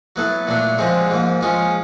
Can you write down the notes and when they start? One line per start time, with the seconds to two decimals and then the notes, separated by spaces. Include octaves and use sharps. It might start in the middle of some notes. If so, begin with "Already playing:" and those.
0.16 F#3 B3 E4 A4
0.47 A#2 F#3 A3 D4
0.78 D3 F3 G#3 C4 F4
1.10 G#2 F3 A#3
1.41 F3 G#3 C#4 F4